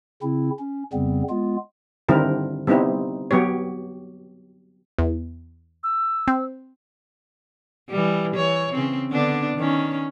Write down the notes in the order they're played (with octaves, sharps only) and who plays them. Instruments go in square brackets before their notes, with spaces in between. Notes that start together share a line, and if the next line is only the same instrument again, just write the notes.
[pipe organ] C#3 C4 E4
C#4
F2 C#3 G3 B3 C4
G#3 B3 F4
[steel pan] D3 D#3 G3 C4 E4 A#4
G3 B3 C4 D#4 E4
F#3 B3 G4 C#5
[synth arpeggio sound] E2
[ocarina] E6
[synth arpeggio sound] C4
[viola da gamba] E3 G3
E3 C#5
C#3 C4
D3 B3 D4
D#3 C#4